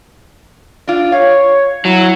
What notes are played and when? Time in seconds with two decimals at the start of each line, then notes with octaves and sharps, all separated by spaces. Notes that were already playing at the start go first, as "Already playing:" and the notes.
0.87 D4 F4
1.12 C#5 F5
1.85 F#3 E4